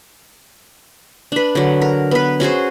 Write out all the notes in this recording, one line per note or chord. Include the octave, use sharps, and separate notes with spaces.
D4 B4
D3 F#3
A#4
B3 B4
C#4 F#4 G#4 C5